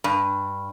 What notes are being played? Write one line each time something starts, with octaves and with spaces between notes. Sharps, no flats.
G2